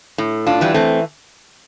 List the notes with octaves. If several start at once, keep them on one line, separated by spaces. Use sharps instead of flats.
A2
D4 F4
E3 G3
A3 C4